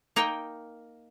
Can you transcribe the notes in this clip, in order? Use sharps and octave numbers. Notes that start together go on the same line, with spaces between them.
A#3 D#4 A#4 G5